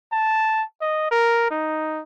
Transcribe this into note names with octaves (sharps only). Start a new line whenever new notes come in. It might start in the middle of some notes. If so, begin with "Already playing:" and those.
A5
D#5
A#4
D#4